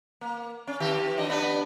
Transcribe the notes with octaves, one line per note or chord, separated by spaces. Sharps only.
A#3
C#4
D#3 G4
F3 D4 D#5
B3 D4 B4